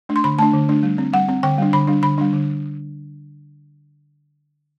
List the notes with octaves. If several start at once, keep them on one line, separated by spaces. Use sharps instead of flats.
A3 D4
C6
D3 B5
A3 D4 A5
D3
A3 D4
G3
C4
G3 F#5
C4
D3 G5
G3 D4
D3 B5
G3 D4
D3 B5
G3 D4
D3